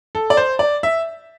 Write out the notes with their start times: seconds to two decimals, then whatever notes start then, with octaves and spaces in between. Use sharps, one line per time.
0.15 A4
0.30 D5
0.37 C5
0.59 D5
0.83 E5